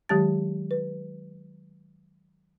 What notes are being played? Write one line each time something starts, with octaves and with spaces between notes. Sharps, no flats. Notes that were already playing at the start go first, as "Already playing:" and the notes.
D#3 F#3 G#3 G4 A5 A6
B4